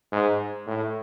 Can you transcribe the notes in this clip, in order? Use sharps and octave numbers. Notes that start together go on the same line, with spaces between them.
G#2
A2